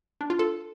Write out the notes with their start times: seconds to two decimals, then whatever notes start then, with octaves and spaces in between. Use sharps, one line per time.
0.21 D4
0.30 F4
0.39 A4